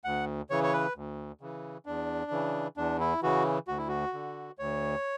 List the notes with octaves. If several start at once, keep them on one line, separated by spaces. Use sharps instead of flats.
D2 F#5
C#3 E3 C#5
C#5
B4
D2
C#3 E3
E2 D4
C#3 E3
E2 D4
E4
C#3 E3 F#4
D2 F#4
E4
F#4
D3
D2 C#5